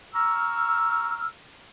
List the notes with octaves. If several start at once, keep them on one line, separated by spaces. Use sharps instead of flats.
A#5 C#6 E6 F6